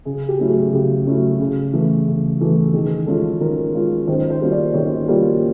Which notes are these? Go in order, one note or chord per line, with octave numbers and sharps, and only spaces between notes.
C#3 G#4
G4
F#3 A3 C#4 E4
G#4
C#3 G4
F#3 A3 C#4 E4
C#3
E3 A3
C#3
E3 A3
D#3 G#4
G#3 C#4 F4 A4
D#3 A#4
G#3 C#4 F4
D#3 C5
C5
G3 A#3 C#4 F4
D5
D#3 C#5
G3 A#3 C#4 F4